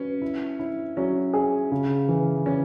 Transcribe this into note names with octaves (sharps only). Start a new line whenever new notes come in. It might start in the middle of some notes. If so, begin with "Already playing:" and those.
Already playing: F#3 C#4 B4
E4
E4
F#3 C#4
G#4
C#3
E3
E3 C#4